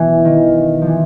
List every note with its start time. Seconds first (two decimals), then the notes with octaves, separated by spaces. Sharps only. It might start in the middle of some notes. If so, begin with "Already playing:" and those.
Already playing: B2 E3
0.25 D#3
0.82 F3
0.87 E3